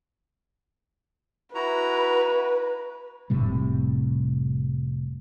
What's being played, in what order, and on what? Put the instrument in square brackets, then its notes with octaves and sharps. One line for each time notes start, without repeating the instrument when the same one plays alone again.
[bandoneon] E4 F#4 A#5 [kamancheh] B4
[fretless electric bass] F1 A2 C3 G3